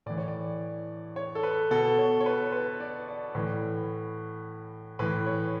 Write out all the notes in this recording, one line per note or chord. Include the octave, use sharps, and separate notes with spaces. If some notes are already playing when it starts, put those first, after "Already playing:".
A2 E3 D5
C#5
D5
C#5
A4
B4
B2 A4
C#5
C#5
B4
B4
D5
D5
A2 E3 B4
A2 E3 B4
C#5